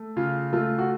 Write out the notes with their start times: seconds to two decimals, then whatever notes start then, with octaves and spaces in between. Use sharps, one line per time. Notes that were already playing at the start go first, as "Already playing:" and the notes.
Already playing: A3
0.16 C#3 F4
0.53 A3 F4
0.79 F#4